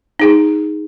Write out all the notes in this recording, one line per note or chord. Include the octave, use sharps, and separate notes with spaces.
D#4 G#4